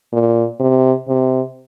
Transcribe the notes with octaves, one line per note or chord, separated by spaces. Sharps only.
A#2
C3
C3